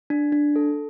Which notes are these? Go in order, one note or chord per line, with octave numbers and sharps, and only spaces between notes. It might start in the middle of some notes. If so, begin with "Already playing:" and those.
D4
D4
A4